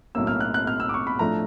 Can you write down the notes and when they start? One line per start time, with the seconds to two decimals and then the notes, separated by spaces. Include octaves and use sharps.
0.15 B1 A2 F#3 A#3 C#4 E6
0.27 F6
0.40 F#6
0.54 F#6
0.67 F6
0.80 E6
0.89 D6
0.94 C#6
1.07 B5
1.19 A2 F3 A3 D4 A#5